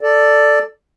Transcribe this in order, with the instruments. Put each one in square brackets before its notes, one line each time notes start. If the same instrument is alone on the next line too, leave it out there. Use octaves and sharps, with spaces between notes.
[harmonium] A4 D5